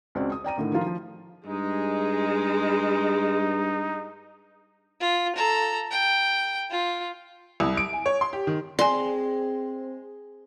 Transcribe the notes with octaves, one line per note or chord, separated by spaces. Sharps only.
C#2 C4 F#4 D5
D#6
D5 G5 A#5 D#7
A2 D3 D#3 E4
D#3 F3 F4 A#5
F3
G2 G#3 D#4 G#4
F4
A4 A#5
G5
F4
C2
D7
G#5
C#5
C6
G4
D#3
G#3 C4 D5 G#5 C6